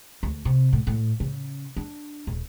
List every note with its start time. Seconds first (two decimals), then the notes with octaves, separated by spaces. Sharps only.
0.23 D2
0.45 C3
0.73 A2
0.87 A2
1.20 C#3
1.76 D4
2.27 D#1